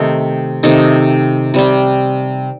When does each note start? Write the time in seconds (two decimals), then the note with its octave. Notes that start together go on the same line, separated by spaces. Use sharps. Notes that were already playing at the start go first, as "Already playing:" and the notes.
Already playing: C3 D#3 A3 D#4 D#5
0.63 C3 D#3 A3 D#4
1.54 C3 G3 C4